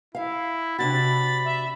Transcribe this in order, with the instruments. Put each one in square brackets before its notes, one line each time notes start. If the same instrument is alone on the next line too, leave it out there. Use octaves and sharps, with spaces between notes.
[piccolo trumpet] E4 [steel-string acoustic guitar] E5 F5
[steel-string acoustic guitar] C3 D4 F#4 [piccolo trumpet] B5 [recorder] A6
[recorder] E5